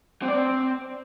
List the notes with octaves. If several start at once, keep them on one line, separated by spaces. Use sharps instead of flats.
C4
D5
C4